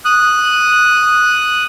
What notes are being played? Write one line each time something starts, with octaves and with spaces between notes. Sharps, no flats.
D#6 F#6